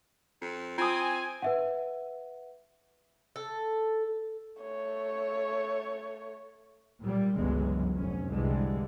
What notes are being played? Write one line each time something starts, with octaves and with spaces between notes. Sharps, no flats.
F2
C4 F4 G#5 D#6
B4 E5 F#5
A4
A3 C#5
A#2 G3
G1 C#2 F#2 E3 F#3 G#3
F1 C#4
C2 D3 E3 G3 G#3